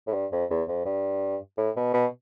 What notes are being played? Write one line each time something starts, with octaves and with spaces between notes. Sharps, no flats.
A2
G2
F2
E2
F2
G2
A2
B2
B2